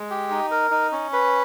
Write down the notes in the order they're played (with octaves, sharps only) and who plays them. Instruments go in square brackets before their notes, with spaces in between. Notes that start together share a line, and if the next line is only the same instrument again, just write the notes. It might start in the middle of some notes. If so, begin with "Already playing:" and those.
Already playing: [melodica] G#3
G4
D#4
A#4
D#4
C#4
B4